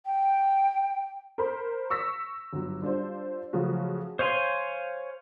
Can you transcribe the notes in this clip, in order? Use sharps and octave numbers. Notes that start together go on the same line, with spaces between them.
G5
A#4 C5 B5
C#6 E6 A#6 B6
G1 F#3
G3 D4 F4 C5
C#3 F3 F#3 A3 F#4
C5 C#5 F5 G#5 C6